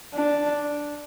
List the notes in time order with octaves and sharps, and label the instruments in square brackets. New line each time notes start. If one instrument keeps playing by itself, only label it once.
[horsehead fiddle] D4